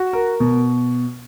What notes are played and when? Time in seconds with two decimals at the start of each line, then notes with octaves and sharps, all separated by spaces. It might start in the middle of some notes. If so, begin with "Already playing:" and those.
Already playing: F#4
0.13 A#4
0.40 B2